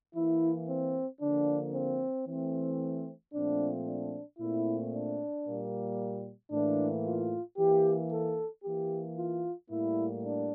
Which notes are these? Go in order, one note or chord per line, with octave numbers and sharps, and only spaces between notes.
E3 A#3 E4
C4
D3 F3 A#3 D4
C4
E3 A3 C4
A#2 F3 A3 C4 D4
D4
A#2 A3 C4 E4
D4
A#2 G3 A#3
A2 E3 A#3 D4
F4
E3 A#3 G4
A4
E3 A#3 G4
F4
A2 G3 A#3 E4
D4